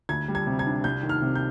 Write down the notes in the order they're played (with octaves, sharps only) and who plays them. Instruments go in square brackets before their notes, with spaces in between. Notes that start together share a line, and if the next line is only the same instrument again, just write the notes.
[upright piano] D2 G#6
G3
G#6
C3
G#6
D4
C2 G6
D#3
F6
C3
G6